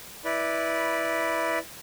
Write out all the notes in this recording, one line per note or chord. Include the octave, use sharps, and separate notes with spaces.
E4 B4 D5